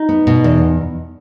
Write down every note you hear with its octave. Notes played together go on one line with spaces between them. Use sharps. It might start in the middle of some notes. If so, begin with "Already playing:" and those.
Already playing: D#4
B3
B2
E2